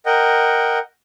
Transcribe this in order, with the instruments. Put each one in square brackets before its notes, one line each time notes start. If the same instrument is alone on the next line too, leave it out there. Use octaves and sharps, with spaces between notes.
[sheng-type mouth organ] A#4 D#5 F#5 G5